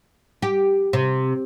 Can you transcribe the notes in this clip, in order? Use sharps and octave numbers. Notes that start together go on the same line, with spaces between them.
G4
C3